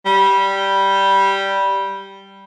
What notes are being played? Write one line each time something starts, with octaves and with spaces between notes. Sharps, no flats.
G3